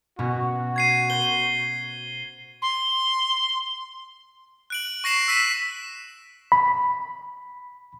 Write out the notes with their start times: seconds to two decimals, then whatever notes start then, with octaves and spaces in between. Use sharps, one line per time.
0.19 B2 B3 C#4 F#4
0.76 G#6 C7 D#7
1.10 C5 G7
2.62 C6
4.70 F#6 D7 F#7
5.04 C#6 A#6 C7 E7
5.28 E6 B6 D#7 E7
6.52 B5